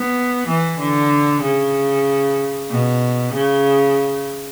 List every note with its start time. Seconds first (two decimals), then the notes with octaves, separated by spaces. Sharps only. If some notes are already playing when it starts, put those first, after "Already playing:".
Already playing: B3
0.48 E3
0.79 D3
1.42 C#3
2.70 B2
3.33 C#3